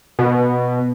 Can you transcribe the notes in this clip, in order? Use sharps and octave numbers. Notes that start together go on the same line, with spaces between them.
B2